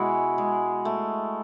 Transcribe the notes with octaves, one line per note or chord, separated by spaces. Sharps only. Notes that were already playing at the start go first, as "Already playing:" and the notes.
Already playing: B2 G#3 E4 F#4 G#4
G#3
A3